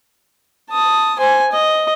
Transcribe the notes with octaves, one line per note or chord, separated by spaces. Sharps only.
A5 D#6
C5 G#5
D#5